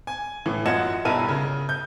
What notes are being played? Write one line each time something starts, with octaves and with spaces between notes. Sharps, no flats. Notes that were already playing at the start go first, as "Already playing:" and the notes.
G#5
A2 E3
F#2 F4 D#5 F#5 G#6 E7
B1 G2 E4 A#4 A5 D#7
C#3
G6